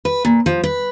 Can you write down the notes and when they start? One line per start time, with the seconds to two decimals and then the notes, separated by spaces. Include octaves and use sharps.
0.05 B4
0.25 A#2
0.46 F3
0.64 B4